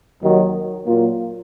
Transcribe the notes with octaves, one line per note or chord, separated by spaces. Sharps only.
D#2 D#3 F#3
A#2 F#3 A#3 F4